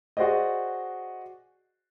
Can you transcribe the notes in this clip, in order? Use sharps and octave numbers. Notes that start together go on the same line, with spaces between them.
F#4 G#4 C5 D5 D#5